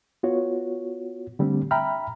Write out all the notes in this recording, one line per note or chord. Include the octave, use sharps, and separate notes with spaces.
B3 F4 F#4 C#5
D3 G3 A3 C4 D4
E5 G5 A#5 B5 F6